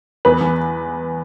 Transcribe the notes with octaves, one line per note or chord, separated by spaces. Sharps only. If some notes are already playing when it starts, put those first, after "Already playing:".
E2 B4
E2